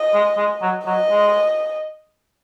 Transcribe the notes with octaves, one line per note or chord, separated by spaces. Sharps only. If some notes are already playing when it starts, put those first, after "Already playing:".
Already playing: D#5
G#3
G#3
F#3
F#3 D#5
G#3